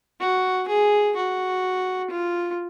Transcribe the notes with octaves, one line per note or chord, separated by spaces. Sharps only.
F#4
G#4
F#4
F4